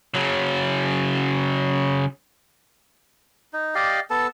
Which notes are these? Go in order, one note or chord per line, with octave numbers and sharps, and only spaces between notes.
C#3 F#3
D#4
G4 D5 D#5 F5
B3 A4 A5